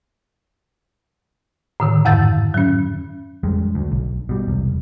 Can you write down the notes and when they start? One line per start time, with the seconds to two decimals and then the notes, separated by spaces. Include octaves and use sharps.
1.80 A2 D3 D#3
2.05 F2 G#2 F5 E6 G6 A6
2.54 F#3 C#4
3.43 F2 G3 G#3
3.75 D2
3.92 B1
4.29 B2 G3
4.48 E1 C2